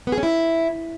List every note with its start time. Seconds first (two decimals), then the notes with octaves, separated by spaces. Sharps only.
0.07 B3
0.12 G#4
0.18 C#4
0.23 E4